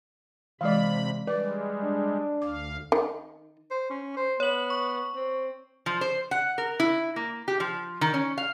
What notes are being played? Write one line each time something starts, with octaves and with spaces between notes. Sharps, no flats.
C3 E3 G#3 D5 D#5 F5 B5
G3 G#3 B4 D5
D4
D2 F5 D6
D#3
C5
C#4
C5
B3 C#5 F#7
C#6
C4
F3
C5
F#5
A#4
E4
A#3
G4
F3
D#3
C#4
F5